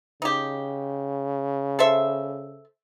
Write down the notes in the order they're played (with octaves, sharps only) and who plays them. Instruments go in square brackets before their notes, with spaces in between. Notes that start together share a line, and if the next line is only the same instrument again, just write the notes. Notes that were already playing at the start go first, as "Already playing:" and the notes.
[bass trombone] C#3 [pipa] D#4 G4
[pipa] A4 C5 E5